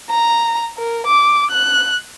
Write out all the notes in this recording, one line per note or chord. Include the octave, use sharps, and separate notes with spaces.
A#5
A#4
D6
F#6